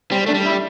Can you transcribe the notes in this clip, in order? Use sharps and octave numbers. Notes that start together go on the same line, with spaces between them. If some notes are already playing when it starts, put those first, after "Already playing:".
G3 C4
A3 D4
G3
E4